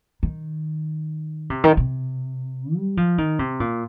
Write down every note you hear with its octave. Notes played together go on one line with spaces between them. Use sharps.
D#3
C3
D#3
C3
G3
F3
D#3
C3
A#2